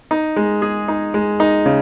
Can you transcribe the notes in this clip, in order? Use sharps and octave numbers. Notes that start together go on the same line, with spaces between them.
D#4
G#3
G#4
D#4
G#3
D#4
C#3